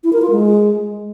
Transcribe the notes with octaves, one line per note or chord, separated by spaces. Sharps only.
E4
A#4
F4
G#3